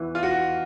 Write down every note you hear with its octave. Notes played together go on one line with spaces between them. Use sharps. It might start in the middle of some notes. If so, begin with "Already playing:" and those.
Already playing: E2 E3
F4
F#4